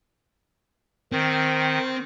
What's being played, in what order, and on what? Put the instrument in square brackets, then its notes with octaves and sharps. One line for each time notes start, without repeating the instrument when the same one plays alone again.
[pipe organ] D#3 [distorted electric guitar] C4